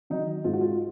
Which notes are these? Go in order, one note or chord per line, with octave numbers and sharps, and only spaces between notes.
D#3 F#3 D#4
G#2 F4
F#4
F4